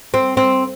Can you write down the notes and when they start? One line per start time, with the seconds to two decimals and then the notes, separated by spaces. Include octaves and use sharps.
0.14 C4
0.37 C4